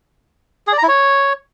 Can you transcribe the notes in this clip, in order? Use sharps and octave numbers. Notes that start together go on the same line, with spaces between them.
G#4
D5
A#5
E4
C#5